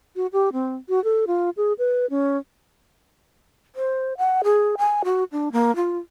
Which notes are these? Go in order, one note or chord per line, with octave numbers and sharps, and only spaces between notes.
F#4
G4
C4
F#4
A4
F4
G#4
B4
C#4
C5
F#5
G#4
G#5
F#4
D4
A#3
F4